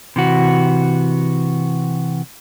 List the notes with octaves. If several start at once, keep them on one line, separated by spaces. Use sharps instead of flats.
C3 E3 F#4